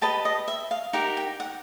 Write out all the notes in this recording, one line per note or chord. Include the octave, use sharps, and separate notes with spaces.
G4 B4 D#5 A5
D#5
E5
F5
D#4 G4 A#4 F#5
G5
F#5